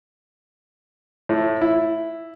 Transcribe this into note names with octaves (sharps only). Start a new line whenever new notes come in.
A2
E4